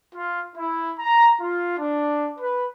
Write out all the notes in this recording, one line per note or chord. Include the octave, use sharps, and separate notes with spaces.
F4
E4
A#5
F4
D4
B4